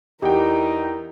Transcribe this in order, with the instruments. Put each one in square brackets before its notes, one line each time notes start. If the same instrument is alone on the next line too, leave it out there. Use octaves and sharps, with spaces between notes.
[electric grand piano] E2 F#5 G5 [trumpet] D#4 [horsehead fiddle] E4 A#4 [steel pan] G4